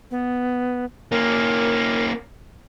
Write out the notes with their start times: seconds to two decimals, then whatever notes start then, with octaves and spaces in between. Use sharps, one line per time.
0.11 B3
1.12 A#3 C#4 A#4